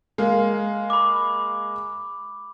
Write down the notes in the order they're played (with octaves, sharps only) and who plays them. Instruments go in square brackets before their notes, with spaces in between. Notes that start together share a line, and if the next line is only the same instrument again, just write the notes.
[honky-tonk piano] G#3 A#3 F5
[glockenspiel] B5 D6